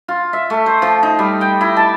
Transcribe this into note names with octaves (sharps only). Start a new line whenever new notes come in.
F4
E5
A3
C5
F3
D#4
G3
G5
E4
A5